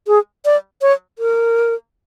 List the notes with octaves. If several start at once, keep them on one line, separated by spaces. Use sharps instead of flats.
G#4
D5
C#5
A#4